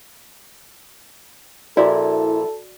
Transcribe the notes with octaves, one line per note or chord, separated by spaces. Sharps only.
A#1 A#2 E4 F#4 A4 D5